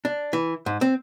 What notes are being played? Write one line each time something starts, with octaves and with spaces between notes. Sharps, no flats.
D4
E3
G#2
C4